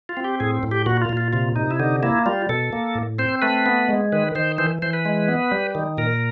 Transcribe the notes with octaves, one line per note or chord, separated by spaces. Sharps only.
F4
C4
G4
A2 G#4
A2
G4
A#2 F#4
F4
A#2
F4
C3 F4
C3 D#4
E4
D3 D#4
A#3 E4
G3 F4
B2 A4
A#3
A2
C4 C5
A3 B4
B3
G#3
D#3 B4
D#3 C5
E3 C5
E3 C5
B4
G#3
B3
G3
D#3
A#2 A#4